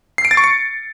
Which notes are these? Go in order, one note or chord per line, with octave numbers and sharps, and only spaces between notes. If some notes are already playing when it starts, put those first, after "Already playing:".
C7
D7
A6
C#6
C#7